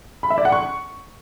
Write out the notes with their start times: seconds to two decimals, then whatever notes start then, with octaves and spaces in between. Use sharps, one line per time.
0.23 B5
0.30 E5
0.38 D5
0.45 F#5
0.52 C#6